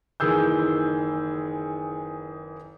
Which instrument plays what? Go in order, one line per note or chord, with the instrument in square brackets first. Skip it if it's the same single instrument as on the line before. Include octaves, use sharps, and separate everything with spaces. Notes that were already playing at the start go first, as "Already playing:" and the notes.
[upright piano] F#1 D#3 E3 G#4 E6 G6